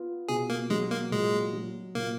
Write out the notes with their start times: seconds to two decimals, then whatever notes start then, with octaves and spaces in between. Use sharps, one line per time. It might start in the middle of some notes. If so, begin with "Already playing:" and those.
Already playing: B3 F4
0.28 B2 G#4
0.50 A#3
0.70 F#3 G#3
0.91 A#3
1.12 A#2 G#3
1.53 F#3
1.95 A#2 A#3